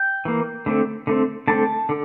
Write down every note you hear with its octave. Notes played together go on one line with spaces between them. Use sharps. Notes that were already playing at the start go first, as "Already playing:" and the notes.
Already playing: G5
E3 A#3
D3 A3 C4
D3 A3 C4
D3 A3 C4 A5
D3